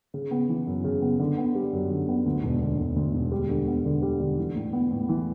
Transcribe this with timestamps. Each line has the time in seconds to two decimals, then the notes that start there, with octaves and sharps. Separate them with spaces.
0.14 C#3
0.31 B3
0.49 E3
0.67 F#2
0.84 C#3
1.02 B3
1.20 D3
1.37 B3
1.55 G3
1.73 F#2
1.90 D3
2.08 B3
2.26 D2
2.43 E1
2.61 D3
2.79 E1
2.96 D2
3.14 E1
3.32 G3
3.49 D3
3.67 B3
3.85 D3
4.02 G3
4.20 D3
4.38 E3
4.55 A2
4.73 B3
4.91 A2
5.09 E3